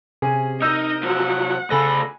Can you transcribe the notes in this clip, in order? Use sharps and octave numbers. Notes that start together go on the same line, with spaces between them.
C3 C#4 G#4
D#4 A#4 D#5 E6 G6
F3 F#3 F#5
D2 C#3 A4 G#5 B5 A#6